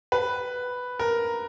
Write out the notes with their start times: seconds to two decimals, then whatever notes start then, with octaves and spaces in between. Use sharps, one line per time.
0.12 B4
0.99 A#4